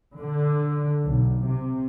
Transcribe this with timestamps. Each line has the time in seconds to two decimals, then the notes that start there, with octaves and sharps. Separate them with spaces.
0.18 D3
1.03 B1
1.45 C3